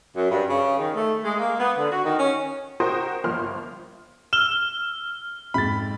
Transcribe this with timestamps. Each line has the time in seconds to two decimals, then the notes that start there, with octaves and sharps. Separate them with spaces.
0.15 F#2
0.31 G2
0.48 C#3
0.79 D#3
0.95 A3
1.24 G#3
1.39 A#3
1.60 B3
1.77 D3
1.92 F#4
2.05 D#3
2.19 C#4
2.80 F#4 A#4 C5 G5 C6 D#6
3.24 G1 F3 A#3 C6 F6
4.33 E6 F6 E7 G7
5.54 F2 G#2 B5 A6